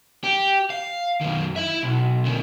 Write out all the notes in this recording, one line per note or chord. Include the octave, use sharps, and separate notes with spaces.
G4
F5
F#2 D#3
E4 E5
B1
A#2 D3